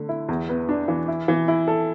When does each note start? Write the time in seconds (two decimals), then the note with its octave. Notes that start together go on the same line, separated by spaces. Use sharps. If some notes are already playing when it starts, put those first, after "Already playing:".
Already playing: D3 A3
0.09 E4
0.29 E2
0.49 B3
0.69 D4
0.88 E3
1.08 E4
1.28 E3
1.48 E4
1.68 A4